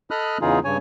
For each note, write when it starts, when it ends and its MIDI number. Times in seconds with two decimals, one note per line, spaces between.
0.11 0.38 69
0.11 0.38 75
0.11 0.38 83
0.11 0.38 87
0.11 0.38 89
0.11 0.38 90
0.41 0.59 40
0.41 0.59 49
0.41 0.59 52
0.41 0.59 63
0.41 0.59 65
0.41 0.59 68
0.64 0.77 43
0.64 0.77 49
0.64 0.77 73
0.64 0.77 80